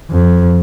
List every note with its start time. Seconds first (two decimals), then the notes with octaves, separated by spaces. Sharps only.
0.10 F2